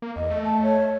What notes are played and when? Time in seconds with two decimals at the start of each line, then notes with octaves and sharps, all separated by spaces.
0.02 A#3
0.16 E2 D#5
0.30 A3
0.45 A5
0.63 C#5